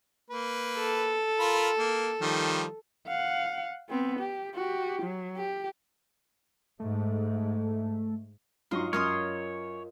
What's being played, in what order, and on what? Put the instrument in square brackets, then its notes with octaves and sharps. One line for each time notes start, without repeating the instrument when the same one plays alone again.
[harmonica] A#3 B4
[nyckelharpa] A4
[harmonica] F4 A#4 B5
A#3
D#3 F3 G3
[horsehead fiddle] F5 F#5
B3 C4
G4
F#4 G4
F#3
G4
[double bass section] G#2 [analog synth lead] A3
[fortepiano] G2 F#3 D#4 [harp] F4 D#5 C#6 [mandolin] C6
[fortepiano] F#2 [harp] A#4 [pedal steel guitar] C#5 [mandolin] C6 D#6 F6